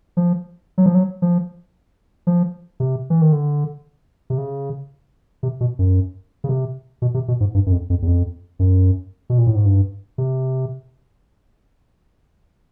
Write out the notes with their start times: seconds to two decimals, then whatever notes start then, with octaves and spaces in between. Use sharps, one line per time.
0.17 F3
0.78 F#3
0.86 F3
0.95 F#3
1.22 F3
2.27 F3
2.80 C3
3.10 E3
3.22 D#3
3.33 D3
4.30 C3
4.38 C#3
5.43 C3
5.61 B2
5.79 F#2
6.44 C#3
6.49 C3
7.02 B2
7.14 C3
7.28 B2
7.40 G#2
7.54 G2
7.66 F#2
7.72 F2
7.90 F2
8.02 E2
8.07 F2
8.59 F#2
9.30 B2
9.38 A#2
9.47 A2
9.55 G#2
9.65 G2
10.18 C3